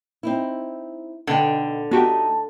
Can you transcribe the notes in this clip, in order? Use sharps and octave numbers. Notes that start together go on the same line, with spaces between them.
C4 D#4 E4
B2 D3 D#4 G5
A3 B3 D#4 F#4 G4 A5